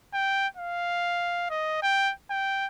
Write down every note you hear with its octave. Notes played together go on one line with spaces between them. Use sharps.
G5
F5
D#5
G5
G5